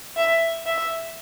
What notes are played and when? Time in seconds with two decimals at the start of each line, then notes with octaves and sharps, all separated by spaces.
0.17 E5
0.66 E5